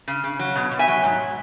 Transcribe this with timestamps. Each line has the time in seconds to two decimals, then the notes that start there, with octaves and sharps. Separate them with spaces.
0.08 C#3
0.24 C#3
0.39 F#3
0.56 B2
0.71 B2
0.79 E5 G#5
0.88 F#3
1.04 G#2